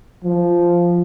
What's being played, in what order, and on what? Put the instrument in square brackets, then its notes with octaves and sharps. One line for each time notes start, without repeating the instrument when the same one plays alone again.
[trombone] F3